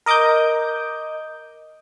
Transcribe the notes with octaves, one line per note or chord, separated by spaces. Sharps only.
A#4 D#5 D6 D#6 G6